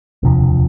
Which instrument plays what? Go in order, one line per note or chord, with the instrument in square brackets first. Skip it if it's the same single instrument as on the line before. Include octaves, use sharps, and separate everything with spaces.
[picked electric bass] E1 D2 C3 F3